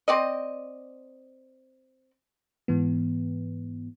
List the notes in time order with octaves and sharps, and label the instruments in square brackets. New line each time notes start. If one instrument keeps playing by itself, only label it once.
[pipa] C4 D5 D#5
[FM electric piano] G#2 E3 B3